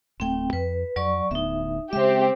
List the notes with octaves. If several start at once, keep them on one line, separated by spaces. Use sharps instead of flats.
D1 A3 C4 G5
F2 B4
F2 F#3 D5 C#6
D1 D2 B3 D#4 E5
C#3 G#3 C4 G4 E5